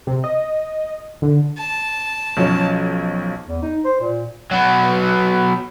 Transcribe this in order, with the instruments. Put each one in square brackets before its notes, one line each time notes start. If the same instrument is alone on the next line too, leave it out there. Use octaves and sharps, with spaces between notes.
[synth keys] C3
D#5
D3
[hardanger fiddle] A5
[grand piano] B1 F3 C#4
[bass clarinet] E2
D#4
C5
A#2
[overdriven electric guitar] F#3 B3